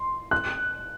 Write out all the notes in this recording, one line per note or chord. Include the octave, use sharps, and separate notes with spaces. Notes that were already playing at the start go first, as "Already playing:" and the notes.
Already playing: C6
F#6